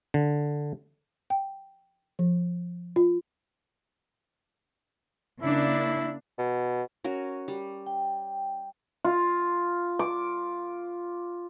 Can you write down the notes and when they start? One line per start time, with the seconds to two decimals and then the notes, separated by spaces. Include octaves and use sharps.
0.14 D3
1.30 G5
2.19 F3
2.96 F4
5.42 C#3 A#3 D4 E4
6.38 B2
7.04 C#4 F#4 A#4
7.48 G3
7.87 G5
9.05 F4
9.99 D6